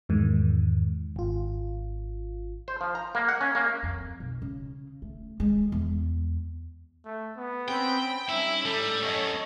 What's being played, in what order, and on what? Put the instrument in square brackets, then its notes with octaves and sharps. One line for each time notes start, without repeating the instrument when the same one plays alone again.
[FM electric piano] E2 G#2 D#3
G#1 F4
[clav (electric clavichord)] C5
F3
A#5
A#3
F#5
C#4
A#3
[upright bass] F2
B1
C#3
A3
G#3
E2
[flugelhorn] A3
B3
[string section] C4 C#4 B5 [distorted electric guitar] G5
[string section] G3 C#4 D#4 [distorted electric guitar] E4 [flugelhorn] E5
[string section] A2 [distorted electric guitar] G3 [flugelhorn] A4
[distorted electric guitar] F#2 [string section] C#5 D#5 C#6